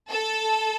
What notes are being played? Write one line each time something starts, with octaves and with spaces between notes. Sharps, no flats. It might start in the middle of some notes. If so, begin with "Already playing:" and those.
A4